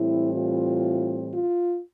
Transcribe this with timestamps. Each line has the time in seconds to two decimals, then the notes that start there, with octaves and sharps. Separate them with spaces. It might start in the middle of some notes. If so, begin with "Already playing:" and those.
Already playing: A2 E3 G3 C4 E4
0.34 F4
1.34 F4